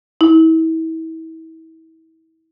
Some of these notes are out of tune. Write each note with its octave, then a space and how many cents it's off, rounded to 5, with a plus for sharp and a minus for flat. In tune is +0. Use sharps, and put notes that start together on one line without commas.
E4 -35